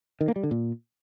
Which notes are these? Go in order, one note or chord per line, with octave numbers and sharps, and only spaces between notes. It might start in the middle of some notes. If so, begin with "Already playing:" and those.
D#3
A#3
G3
D3
A#2